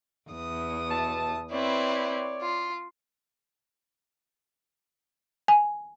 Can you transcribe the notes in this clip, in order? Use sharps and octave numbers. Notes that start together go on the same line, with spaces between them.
E2 D#6
B2 E5 A5
C4 E4 B4 C#5 D5
F4
G#5